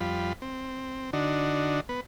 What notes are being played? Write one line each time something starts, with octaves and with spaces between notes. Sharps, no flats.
F2 G3 F4 B5
C4
D3 D4 D#4 F#4
B3 B4